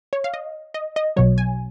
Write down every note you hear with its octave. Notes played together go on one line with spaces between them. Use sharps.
C#5
F5
D#5
D#5
D#5
B1 B2 F#3 C#5
G#5